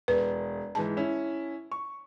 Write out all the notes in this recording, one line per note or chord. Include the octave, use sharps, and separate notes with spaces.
E1 B4
G#2 E3 A5
C#4 E4
C#6